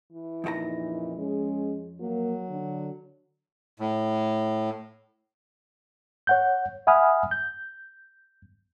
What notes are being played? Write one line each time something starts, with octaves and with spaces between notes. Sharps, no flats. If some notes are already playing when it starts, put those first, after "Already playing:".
E3
F2 A#2 C#3 D#4 F#4 A#5
G#3 C#4 G#4
F#3 A#3
D3
A2
C#5 F#5 G6
E5 F#5 G#5 B5 D#6 F6
G6